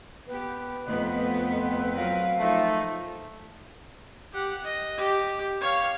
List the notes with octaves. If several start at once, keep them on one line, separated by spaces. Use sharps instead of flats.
B3 G4 B4
F2 A3 B3 D#5
C4
F#3 A#4 B4 F5
F3 A3 D#4
G4 F#5
D#5
G4
C#5 F5